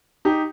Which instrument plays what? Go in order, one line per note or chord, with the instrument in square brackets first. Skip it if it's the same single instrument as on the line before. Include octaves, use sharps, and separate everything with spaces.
[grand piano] D#4 G4